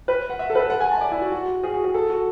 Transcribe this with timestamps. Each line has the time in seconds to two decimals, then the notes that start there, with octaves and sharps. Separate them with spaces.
0.08 B4
0.30 F#5
0.39 E5
0.50 A4
0.55 B4
0.60 A4
0.70 F#5
0.81 G#5
0.91 A5
0.97 E5
1.01 D5
1.12 E4
1.22 F#4
1.32 F#4
1.63 G#4
1.74 F#4
1.84 G#4
1.94 A4
2.10 F#4